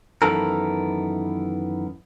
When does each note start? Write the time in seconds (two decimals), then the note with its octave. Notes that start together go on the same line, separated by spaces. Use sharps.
0.22 F#2 D#3 E3 B3 A4 A#4